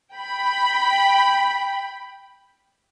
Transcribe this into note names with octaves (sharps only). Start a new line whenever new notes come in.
G5 B5